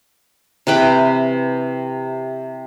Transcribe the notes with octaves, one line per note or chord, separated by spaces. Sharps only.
C3 E3 B4 G5